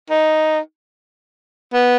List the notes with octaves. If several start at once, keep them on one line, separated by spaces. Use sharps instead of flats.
D#4
B3